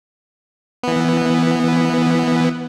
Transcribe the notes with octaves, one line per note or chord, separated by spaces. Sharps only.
E3 B3